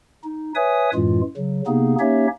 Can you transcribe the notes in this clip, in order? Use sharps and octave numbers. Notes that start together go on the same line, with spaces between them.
D#4
B4 C#5 E5 G#5 D#6
F#2 A2 E3 G#3 F4
C#3 F#3
C3 A#3 B3 D#4 G#4
A#3 C#4 D#4 G4 C#5 E5